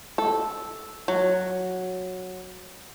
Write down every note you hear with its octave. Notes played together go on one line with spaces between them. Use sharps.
A4
F#3